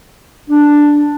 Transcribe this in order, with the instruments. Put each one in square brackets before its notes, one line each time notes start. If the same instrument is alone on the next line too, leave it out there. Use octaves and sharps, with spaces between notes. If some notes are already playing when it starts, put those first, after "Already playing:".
[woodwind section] D4